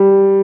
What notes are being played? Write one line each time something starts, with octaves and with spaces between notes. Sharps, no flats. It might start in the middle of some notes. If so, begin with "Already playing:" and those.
Already playing: G3